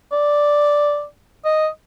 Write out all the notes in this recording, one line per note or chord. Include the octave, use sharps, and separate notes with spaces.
D5
D#5